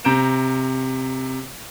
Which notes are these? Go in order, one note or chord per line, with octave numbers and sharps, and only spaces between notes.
C3 A#5 G6 D7 E7